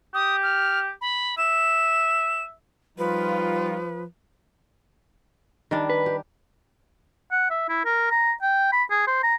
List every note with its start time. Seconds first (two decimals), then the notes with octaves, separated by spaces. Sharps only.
0.14 G4 D#6
0.43 F6
1.01 B5
1.38 E5 E7
2.98 F3 G3 D#4 F4 B4
5.71 D#3 G3 D4
5.90 B4
6.06 G4
7.32 F#5
7.50 E5
7.69 E4
7.85 A#4
8.11 A#5
8.42 G5
8.72 B5
8.90 G#4
9.07 C5
9.23 A#5